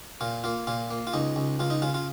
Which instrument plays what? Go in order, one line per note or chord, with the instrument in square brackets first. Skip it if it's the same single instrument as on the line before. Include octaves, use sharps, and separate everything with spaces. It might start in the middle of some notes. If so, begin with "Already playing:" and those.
[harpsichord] A#2 F4
A#3 F4
A#2 F4
A#3
F4
C#2 D#4
C#2
C#2 F4
D#4
C#3 F4
F4